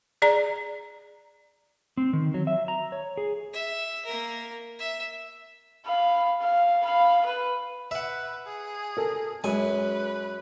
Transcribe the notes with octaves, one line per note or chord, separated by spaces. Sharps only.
G#4 D5 A#5
C4
D#3
F#3
E5
A#5
C#5
G#4
E5
A#3 A#4
E5
F5 B5
F5
F5 B5
B4
B4 E5 F#5
G#4
A4 A#4
F#2 G#3 B4 G#5